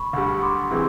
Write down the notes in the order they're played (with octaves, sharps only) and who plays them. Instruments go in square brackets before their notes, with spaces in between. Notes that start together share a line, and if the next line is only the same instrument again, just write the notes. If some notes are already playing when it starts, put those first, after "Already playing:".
Already playing: [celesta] B5 C#6
[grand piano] D2 D3 G3
[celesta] C6 D6
[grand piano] C3 E3 G#3